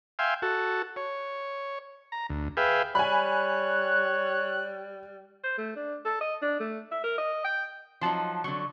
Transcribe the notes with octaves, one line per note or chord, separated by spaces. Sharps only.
E5 F5 G5 G#5 C6
F#4 A4
C#5
A#5
D2
G#4 B4 E5 F5 G5
G3 C#5 G#5 B5 F#6
C5
A3
D4
A4
D#5
D4
A3
E5
A#4
D#5
G5
F3 F#3 D#4 A5 C6
D3 F#3 C#6